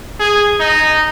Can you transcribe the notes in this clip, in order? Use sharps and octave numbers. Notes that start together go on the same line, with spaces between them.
G#4
D#4